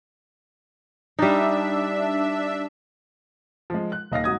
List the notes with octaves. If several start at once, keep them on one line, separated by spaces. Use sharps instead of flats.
G3 D4 D#4 E5
F3 G#3
F#6
D#1 D#5 F5 A#6
G#2 F#3 D#6 G#6